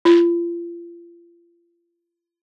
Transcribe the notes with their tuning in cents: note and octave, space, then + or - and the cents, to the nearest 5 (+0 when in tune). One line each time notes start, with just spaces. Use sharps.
F4 -35